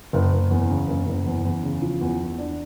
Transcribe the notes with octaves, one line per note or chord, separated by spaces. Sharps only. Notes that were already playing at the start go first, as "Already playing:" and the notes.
F#1
F#1
E2
C#3
F#1
F#1
E2
E2
C#3
F3
E2
E2
D4